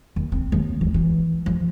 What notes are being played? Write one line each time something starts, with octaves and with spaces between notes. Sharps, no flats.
D#2
C4
D#2
E3
E3
F3